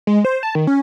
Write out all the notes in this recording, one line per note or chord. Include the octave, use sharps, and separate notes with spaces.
G#3
C5
A5
D#3
C#4